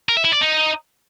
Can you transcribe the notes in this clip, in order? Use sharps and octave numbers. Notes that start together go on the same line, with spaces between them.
A#4
E5
E4
D5
D#4